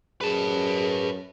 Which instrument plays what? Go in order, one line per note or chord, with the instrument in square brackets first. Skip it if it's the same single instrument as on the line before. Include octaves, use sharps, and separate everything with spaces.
[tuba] F#2 [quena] G#4 [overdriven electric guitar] B4 A5